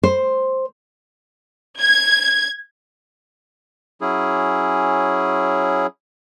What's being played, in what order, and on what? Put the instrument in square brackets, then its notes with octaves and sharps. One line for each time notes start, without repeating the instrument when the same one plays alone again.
[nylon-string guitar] C5
[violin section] G#6
[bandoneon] F#3 C#4 E4 G#4